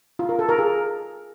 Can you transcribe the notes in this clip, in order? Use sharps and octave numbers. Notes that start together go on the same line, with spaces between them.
F4
A#4
A4
A#4
G#4